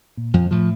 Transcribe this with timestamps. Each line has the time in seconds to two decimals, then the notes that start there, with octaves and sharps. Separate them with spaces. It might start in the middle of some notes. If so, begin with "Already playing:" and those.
0.17 A#2
0.34 F2 F3
0.51 A2 F3